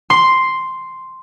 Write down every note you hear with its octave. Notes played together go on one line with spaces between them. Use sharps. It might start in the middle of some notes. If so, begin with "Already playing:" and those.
C6